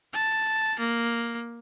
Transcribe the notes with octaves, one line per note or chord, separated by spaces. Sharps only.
A5
A#3